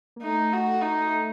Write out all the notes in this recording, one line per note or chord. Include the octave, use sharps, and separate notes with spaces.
A#3
A3 D#4
F#4
D#4